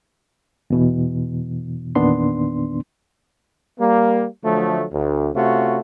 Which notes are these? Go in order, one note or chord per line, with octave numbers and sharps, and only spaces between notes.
E2 B2 E3
E2 A#2 D#3 B3 D4 C6
G3 A#3
D3 F3 F#3 A3
D2
C3 A3 C#4 F4 F#4